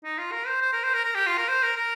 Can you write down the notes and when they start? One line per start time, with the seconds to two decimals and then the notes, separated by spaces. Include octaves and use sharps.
0.04 D#4
0.18 F4
0.32 A#4
0.47 C5
0.62 C5
0.72 A#4
0.83 C5
0.94 A#4
1.05 A#4
1.15 G4
1.26 F4
1.37 A#4
1.48 C5
1.62 A#4
1.77 A#4